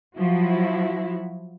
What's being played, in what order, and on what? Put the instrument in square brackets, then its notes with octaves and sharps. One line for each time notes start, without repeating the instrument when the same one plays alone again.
[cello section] F3 F#3 E4 F#4